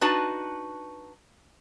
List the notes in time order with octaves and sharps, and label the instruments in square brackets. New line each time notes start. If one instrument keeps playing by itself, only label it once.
[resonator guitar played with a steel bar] D4 D#4 F#4 B4 A5